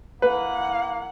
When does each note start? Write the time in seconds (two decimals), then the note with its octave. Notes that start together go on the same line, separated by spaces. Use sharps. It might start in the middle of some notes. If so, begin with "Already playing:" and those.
0.22 A#3 E4 B4 F#5